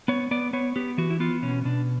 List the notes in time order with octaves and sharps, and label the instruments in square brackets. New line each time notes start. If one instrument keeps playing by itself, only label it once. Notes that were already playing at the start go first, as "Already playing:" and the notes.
[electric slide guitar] B3 C#5
B3 D5
B3 C#5
B3 G4
E3 F#4
E4
B3 F4
B2 C#4
B2 D4